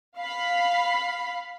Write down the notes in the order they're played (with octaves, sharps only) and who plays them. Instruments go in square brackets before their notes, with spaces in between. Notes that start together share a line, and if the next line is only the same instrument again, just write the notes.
[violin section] F5 B5